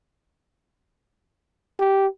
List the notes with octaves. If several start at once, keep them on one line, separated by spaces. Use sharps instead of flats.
G4